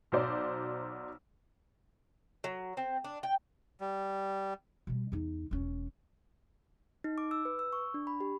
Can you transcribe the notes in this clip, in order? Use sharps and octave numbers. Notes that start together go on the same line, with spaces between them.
B1 F#3 C5 D5
F#3
C4
D4
G5
G3
B2 G3
E2 D#4
E1 C#4
D#4
D6
E6
B4
E6
C#6
D4
B5
G4